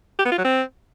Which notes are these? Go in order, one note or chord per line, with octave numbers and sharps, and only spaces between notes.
G4
B3
F4
F#3
C4